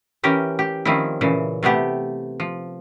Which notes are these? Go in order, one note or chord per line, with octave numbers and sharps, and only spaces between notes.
E3 C#4 G4 A#4
G4
D#3 F3 C4 C#4 E4
A#2 C#3 E3
C3 A3 B3 G4
F3